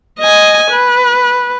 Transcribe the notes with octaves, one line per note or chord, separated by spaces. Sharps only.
D#5 G#5
B4